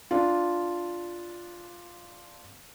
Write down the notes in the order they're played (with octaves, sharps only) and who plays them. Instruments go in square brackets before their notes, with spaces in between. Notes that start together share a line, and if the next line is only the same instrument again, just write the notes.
[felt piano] D4 F4